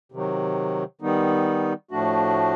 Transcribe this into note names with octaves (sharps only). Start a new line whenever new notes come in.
C3 D#3 F#3
D#3 G3 B3 D#4
A2 F3 A3 D4 F#4